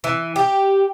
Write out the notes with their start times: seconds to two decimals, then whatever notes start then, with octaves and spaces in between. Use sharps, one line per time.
0.04 E3
0.36 G4